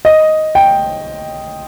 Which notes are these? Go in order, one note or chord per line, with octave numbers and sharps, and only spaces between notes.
D#5
G5